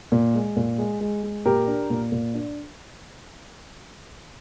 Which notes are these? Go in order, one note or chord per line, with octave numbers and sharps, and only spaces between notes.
A#2
G#3
A#2
G#3
G#3
G#3
A#2 G4 A#4
D4
A#2
A#2
D4